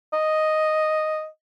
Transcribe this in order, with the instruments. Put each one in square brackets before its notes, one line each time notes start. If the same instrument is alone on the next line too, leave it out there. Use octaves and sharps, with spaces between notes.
[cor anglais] D#5